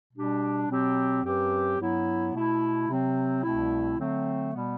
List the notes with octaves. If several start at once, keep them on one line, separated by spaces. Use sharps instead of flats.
B2 G3 D4 G4
B2 F#3 C4 G4
F#2 F#3 C4 G4 B4
G2 F#3 B3 E4
B2 A3 E4
C3 F#3 C4
C2 B2 A3 C4 E4
D3 F#3 A3 C4
B2 G3 B3